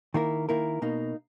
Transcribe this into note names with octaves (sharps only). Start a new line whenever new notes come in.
D#3 A#3 E4 A#4
D#3 A#3 E4 A#4
B2 A#3 D#4